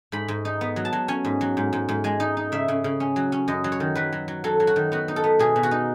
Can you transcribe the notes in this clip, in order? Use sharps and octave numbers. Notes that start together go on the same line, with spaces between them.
G#2 B5
G#2
D#4
B3
F#3
A5
F#3
C#4 G#5
G#2
F#3
G#2
G#2
G#2
G#3 G#5
D#4
D#4
C#3 E5
C#3
C#3
C#4
F#3
C#4
F#2 D#5
F#3
C#5
D#3
F#3 B4
F#3
F#3
F#3 A4
F#3
F#4
D#3
B3 F#4
D#4
A4
B3
B2 G#4
B2
F#4
D#4